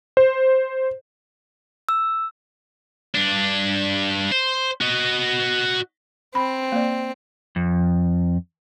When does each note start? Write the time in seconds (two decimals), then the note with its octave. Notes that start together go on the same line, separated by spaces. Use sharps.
0.17 C5
1.89 E6
3.15 G2 D4
4.32 C5
4.81 F#4 D#5
6.35 C4 B5
6.72 A#3 D5
7.56 F2